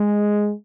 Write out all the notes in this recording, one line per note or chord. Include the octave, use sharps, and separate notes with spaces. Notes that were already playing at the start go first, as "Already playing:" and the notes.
Already playing: G#3